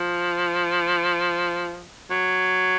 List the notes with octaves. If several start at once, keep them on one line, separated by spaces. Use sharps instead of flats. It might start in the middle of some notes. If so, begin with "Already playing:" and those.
Already playing: F3
F#3